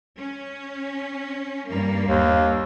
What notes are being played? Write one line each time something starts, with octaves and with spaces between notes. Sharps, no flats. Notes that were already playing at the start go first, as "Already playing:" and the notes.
C#4
G2 A#3
D#2